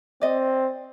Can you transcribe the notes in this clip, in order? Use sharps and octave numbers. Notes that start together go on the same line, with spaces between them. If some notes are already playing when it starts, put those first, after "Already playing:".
C4 D5 D#5